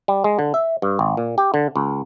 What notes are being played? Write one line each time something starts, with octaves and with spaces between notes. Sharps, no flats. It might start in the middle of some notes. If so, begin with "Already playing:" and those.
G3
G#3
D3
E5
G2
G#1
A#2
G4
D3
C#2